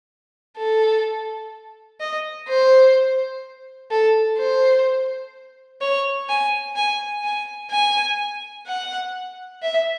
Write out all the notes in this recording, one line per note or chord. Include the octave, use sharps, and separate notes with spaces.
A4
D#5
C5
A4
C5
C#5
G#5
G#5
G#5
G#5
F#5
E5